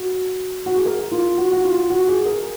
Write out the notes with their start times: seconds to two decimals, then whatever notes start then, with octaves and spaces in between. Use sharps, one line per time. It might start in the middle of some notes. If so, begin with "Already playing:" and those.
Already playing: F#4
0.66 F#4
0.76 G#4
0.85 A#4
1.11 F4
1.38 F#4
1.52 F#4
1.64 F4
1.90 F#4
2.08 G#4
2.25 A#4